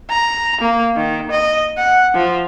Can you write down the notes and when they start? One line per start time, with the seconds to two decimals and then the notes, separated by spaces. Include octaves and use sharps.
0.10 A#5
0.61 A#3
0.97 D#3
1.31 D#5
1.78 F#5
2.14 F3